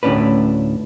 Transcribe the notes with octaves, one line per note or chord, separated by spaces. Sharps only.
D2 A2 C#4 D4 B4